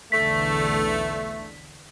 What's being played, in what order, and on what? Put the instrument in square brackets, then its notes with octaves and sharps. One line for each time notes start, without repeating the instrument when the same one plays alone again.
[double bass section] B1 E2 D3 [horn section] A3 [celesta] B6